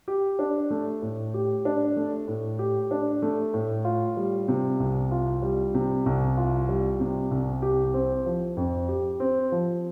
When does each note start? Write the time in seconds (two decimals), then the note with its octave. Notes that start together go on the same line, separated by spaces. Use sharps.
0.08 G4
0.39 D4
0.70 A3
1.02 A2
1.34 G4
1.65 D4
1.96 A3
2.28 A2
2.59 G4
2.91 D4
3.22 A3
3.54 A2
3.85 F4
4.17 G3
4.48 C3
4.80 C2
5.11 F4
5.42 G3
5.74 C3
6.06 C2
6.37 F4
6.69 G3
7.00 C3
7.31 C2
7.62 G4
7.94 C4
8.26 F3
8.57 F2
8.88 G4
9.20 C4
9.52 F3